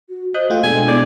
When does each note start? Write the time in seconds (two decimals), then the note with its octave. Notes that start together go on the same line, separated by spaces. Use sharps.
0.09 F#4
0.34 C5 D#5 D#6 F#6 G6
0.50 A3 F4 A4 G5
0.63 B2 G#3 D4 G#5
0.88 B3 E4 D5